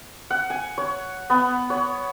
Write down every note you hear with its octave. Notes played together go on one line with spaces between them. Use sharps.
F#5
G#5
C#5
B3
C#5